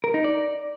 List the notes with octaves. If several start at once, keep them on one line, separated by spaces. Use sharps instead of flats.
A#4
D#4
D5